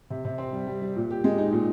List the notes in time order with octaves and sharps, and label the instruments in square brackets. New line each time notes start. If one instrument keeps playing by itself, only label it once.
[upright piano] C3
C3
C4
G3
G3
G3
A#2
G4
G#3
D#4
A#2